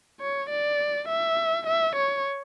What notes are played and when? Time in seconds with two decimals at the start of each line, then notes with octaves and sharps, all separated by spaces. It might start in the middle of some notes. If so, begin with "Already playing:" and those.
0.20 C#5
0.50 D5
1.08 E5
1.67 E5
1.96 C#5